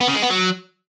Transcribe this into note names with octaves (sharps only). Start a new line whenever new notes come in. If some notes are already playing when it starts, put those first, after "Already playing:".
B3
C#3
G#3
B3
F#3